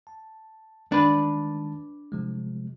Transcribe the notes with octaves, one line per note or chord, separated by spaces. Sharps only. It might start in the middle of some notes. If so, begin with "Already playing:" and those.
A5
D#3 G#3 D4 B4 A5
C3 F3 G#3